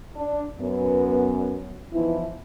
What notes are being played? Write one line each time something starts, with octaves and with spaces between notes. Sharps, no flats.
D4
F#2 B3
E3 F3 B3 D#4 E4